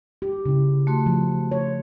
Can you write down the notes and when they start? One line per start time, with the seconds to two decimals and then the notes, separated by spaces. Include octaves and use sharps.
0.22 G4
0.46 C#3 E4
0.87 A3 F#4 C6
1.06 F3
1.52 C#5